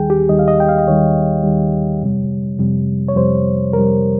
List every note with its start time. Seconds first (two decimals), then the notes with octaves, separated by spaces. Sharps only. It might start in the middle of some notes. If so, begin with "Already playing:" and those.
Already playing: D#2 D#3 G3 G#4 G5
0.10 G4
0.29 D#2 D#3 G3 D#5
0.39 F5
0.48 D#5
0.60 G5
0.69 F5
0.78 D#5
0.87 D#2 D#3 G3 C#5
1.44 D#2 D#3 G3
2.02 F2 C3 G3
2.59 F2 C3 G3
3.09 C#5
3.16 F2 C3 G3 C5
3.73 F2 C3 G3 A#4